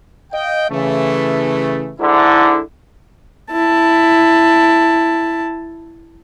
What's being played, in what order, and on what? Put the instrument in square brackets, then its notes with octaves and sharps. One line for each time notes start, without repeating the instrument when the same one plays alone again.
[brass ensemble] D#5 F5 G5
C#3 E3 A3
[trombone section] G#2 D3 [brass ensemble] E4
[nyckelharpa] E4 A5